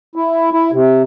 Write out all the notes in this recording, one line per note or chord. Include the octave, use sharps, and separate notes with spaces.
E4
E4
C3